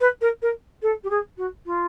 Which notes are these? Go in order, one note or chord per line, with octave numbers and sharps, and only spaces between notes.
B4
A#4
A#4
A4
G4
G#4
F#4
F4